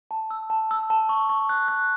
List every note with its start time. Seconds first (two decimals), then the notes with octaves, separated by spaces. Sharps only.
0.11 A5
0.31 E6
0.50 A5
0.71 E6
0.90 A5
1.09 C#6
1.29 C#6
1.49 F#6
1.68 F#6